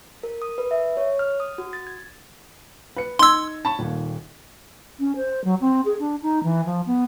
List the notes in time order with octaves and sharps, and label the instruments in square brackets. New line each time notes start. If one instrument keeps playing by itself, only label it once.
[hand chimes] A#4
D#6
B4
E5
C#5
F6
D#6
F#4
A6
G#6
[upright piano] B4 C#7
[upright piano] D#4 G#6 [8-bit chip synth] C6 E6
[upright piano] A5 B5 C#6
D#1 D#2
[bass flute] C#4
C5
F#3
C4
G#4
D4
D#4
E3
F3
B3